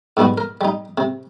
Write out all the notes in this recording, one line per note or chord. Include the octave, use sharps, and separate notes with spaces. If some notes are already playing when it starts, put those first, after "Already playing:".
G#2 B2 G3 B3 F#4
A#4
G3 D#4
C3